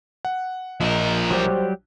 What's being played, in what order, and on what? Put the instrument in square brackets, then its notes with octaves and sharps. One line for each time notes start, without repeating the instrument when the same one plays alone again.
[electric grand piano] F#5
[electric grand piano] A#1 [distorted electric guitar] F3 A#4 [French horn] D#5
[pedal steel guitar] F#3 G3 G4 [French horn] C5